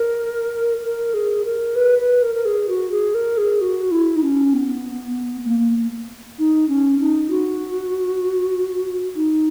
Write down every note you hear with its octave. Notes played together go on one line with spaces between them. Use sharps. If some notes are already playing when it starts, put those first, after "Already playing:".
Already playing: A#4
A#4
G#4
A#4
B4
B4
A#4
A#4
G#4
F#4
G#4
A#4
G#4
F#4
E4
D#4
C#4
B3
A#3
D#4
C#4
D#4
F#4
D#4